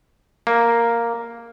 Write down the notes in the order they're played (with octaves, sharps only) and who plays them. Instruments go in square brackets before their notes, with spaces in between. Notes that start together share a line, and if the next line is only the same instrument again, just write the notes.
[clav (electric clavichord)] A#3